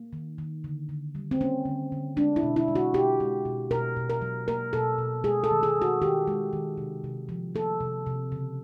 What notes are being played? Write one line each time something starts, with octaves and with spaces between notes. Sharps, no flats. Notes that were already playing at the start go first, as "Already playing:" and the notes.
Already playing: A#3
D#3
D#3
D3
D3
G3
C4
A#3 C#4
D3
D3
G#3 D4
E4
B2
E4
G#3
F#4
B2 G4
G#3
B2
B2 A#4
B2
A#4
F#3
A#3 A#4
B2 A4
B2
G#3 G#4
A4
D#3
G#4
G#3
F#4
D#3 G4
G#3
D#3
C3
C3
F3
A#3 A4
C3
C3
C#3